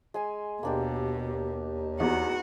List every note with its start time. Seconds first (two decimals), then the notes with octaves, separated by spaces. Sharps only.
0.14 G#3 G#5 C6
0.63 D#2 B2 A#3 D4 G4
2.00 E2 B3 D#4 F#4 F#5